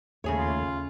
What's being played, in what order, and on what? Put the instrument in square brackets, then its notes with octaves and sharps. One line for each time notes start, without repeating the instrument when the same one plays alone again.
[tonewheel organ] D#2 A3 [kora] C#3 G#4 C#5
[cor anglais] F4